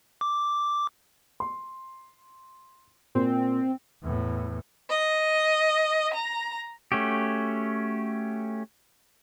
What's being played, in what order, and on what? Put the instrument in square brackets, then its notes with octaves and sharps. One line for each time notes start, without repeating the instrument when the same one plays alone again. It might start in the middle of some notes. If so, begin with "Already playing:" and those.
[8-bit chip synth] D6
[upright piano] C6
[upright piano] A#2 [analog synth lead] C4
[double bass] E2 A2
[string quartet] D#5
A#5
[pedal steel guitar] A3 C#4 F#4 G4